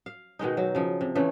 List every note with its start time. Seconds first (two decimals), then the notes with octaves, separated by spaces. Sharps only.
0.06 F5
0.39 B2 D#3 G#3 D#4
0.57 F#3
0.75 C#3 F3
1.01 C3
1.15 C#3 E3 A3